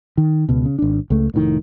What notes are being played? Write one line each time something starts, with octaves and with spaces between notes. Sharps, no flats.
D#3
C#2 B2
C#3
G#1 D4
C#2 A3
F1 A2 C3 D#3